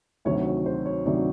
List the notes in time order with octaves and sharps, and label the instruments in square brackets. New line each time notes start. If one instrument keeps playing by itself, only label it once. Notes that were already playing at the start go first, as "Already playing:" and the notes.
[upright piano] D2 C3 D#3 F#3 C#5
C#5
C5
C#5
D2 C3 D#3 F#3 D5